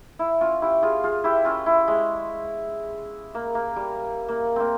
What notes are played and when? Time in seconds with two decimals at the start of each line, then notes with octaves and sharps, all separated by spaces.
0.19 E4
0.41 C#4 F4
0.62 E4 G4
0.82 F4 G#4
1.04 F4 G#4
1.24 E4 G4
1.45 C#4 F4
1.66 E4
1.88 G#3
3.34 A#3
3.55 A#3
3.76 G3
4.28 A#3
4.56 A#3 C4